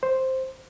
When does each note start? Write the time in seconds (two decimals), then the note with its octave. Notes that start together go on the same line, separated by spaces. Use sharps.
0.03 C5